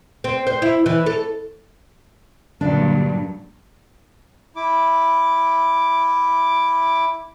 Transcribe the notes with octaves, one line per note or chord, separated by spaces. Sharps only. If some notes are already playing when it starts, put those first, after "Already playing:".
C4
C5
E4
E3
A4
G2 A#2 D3 F#3 D4
E4 D6